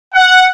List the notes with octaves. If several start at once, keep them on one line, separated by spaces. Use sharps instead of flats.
F#5